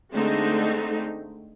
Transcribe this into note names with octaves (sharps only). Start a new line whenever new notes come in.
D3 G#3 A3 C4 D#4